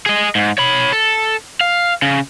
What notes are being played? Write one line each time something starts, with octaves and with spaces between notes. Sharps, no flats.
G#4 D#5
G#2
C#5 B5
A4
F5
C#3